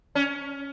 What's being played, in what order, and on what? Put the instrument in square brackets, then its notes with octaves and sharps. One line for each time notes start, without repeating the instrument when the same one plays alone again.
[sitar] C#4